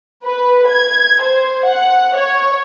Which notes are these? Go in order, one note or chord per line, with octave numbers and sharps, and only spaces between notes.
B4
G#6
C5
F#5
C#5